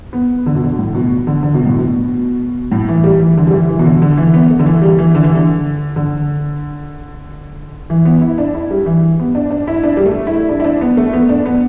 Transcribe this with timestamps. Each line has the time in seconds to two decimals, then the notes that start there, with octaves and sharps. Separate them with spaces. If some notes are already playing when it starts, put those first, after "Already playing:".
0.13 B3
0.46 D3
0.55 B2
0.64 D3
0.79 A2
0.94 B2
1.27 D3
1.43 D3
1.54 B2
1.66 A2
1.78 B2
2.72 A2
2.89 E3
3.04 G3
3.20 E3
3.37 D3
3.47 G3
3.53 E3
3.69 E3
3.79 B2
3.85 D3
4.02 D3
4.18 E3
4.34 B3
4.51 A3
4.59 D3
4.66 E3
4.82 G3
4.99 E3
5.15 D3
5.24 E3
5.35 D3
5.96 D3
7.90 E3
8.05 B3
8.21 E4
8.38 D4
8.54 E4
8.71 G3
8.86 E3
9.19 B3
9.35 D4
9.51 D4
9.67 E4
9.83 D4
9.97 G3
10.06 A3
10.27 E4
10.49 D4
10.60 E4
10.65 D4
10.81 B3
10.97 A3
11.13 B3
11.29 D4
11.46 B3